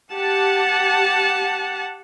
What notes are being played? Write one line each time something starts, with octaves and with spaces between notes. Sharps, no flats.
G4 F#5 A5